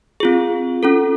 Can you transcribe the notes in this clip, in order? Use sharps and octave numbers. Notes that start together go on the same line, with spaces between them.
C4 F4 G#4
C#4 F4 A4